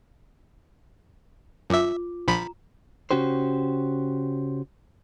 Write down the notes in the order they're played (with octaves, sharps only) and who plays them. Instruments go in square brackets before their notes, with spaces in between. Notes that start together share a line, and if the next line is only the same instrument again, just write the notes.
[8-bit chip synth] F#2 E5 [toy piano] F4 D6
[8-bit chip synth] A#1 F3 B5 [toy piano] A#5
[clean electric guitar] C#3 C#4 F#4 G4 C5